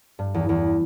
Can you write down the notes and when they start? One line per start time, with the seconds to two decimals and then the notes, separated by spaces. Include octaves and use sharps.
0.19 G2
0.34 E2
0.49 E2